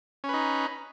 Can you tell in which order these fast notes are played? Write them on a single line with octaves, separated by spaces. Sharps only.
C#4 B4 D#4